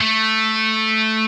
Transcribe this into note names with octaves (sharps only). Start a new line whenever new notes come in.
A3